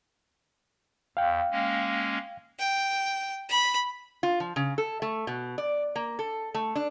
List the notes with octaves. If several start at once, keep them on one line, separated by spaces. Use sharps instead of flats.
E2 F5 G5
G#3 A#3 C#4
G5
B5
F4
F3
C#3
A4
A3
B2
D5
A#3
A4
A3
D4